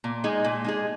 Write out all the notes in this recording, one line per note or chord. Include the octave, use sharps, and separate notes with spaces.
A#2
G#3 D#4 G#4
A#2
G#3 D#4 G#4